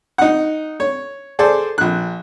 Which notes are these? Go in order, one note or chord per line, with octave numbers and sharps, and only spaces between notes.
D#4 F#5
C#5
G#4 A4 C5 D5
A#1 F#6